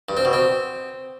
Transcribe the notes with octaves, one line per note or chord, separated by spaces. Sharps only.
G2
C4
B2
C4